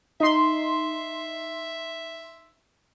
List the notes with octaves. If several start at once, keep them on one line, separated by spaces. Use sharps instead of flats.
D#4 E5 C6